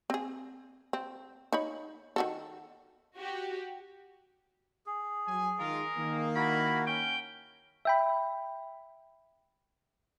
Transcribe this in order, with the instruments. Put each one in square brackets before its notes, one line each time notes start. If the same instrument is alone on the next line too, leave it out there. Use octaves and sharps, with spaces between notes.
[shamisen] C4 G#4
C4
D#4 C#5 B5
D#3 F#4 A4
[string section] F#4 G4
[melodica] G#4
[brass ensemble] F#3 G#5
[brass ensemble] D#3 G#3 F4 [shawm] A#4
[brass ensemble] D#3 A#3
[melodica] E4 F#4 A#4 [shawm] B5
[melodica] C#4 C#6 [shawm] G5
[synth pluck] E5 G5 B5